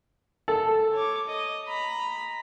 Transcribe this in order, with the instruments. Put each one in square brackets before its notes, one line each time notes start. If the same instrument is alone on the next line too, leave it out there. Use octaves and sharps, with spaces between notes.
[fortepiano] A4
[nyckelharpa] C#5 D6
D#5
A#5 B5